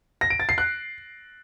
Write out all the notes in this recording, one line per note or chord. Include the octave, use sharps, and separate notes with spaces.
A#6
D7
A6
C7
F#6